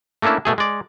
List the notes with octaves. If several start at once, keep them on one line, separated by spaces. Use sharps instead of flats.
A3 A#3 C#4 D4 E4
B2 A3 G#4
G#3 D5